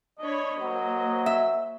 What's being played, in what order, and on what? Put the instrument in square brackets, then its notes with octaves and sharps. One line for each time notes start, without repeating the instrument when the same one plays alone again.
[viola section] D4 C#5 B5 [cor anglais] D#5
[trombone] F#3 [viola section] A#3 C5
[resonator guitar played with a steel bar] E5